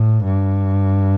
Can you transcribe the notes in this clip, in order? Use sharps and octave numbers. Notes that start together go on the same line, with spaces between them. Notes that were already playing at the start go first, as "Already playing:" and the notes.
Already playing: A2
G2